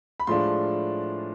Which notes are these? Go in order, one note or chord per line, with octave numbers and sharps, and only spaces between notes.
B5
A2 F3 G#3 D4 F4 C6